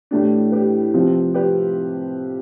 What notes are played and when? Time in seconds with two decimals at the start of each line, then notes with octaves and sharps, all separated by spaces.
0.11 A2 E3 A3 D4 G4
0.52 G4 B4
0.94 C3 F3 C4
1.34 G4 B4